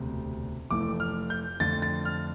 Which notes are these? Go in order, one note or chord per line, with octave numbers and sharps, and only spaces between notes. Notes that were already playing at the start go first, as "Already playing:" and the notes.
Already playing: E1 D2 C3
F1 F2 E3 A3 D6
F6
G6
F2 D3 A3 A6
A6
F6